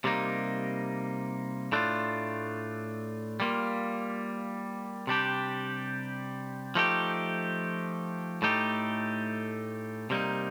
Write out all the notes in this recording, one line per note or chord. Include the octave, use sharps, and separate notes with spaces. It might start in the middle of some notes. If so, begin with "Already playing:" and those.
C3 G3 A#3 D#4
A2 A3 D4 F4
G3 A#3 F4
C3 G3 D4 G4
F3 A3 D#4 G4
A2 A3 D#4 G4
C3 G3 A#3 D#4